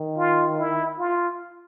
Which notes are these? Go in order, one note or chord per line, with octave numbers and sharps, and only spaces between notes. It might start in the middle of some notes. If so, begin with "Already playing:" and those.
Already playing: D#3
F4
E4
F4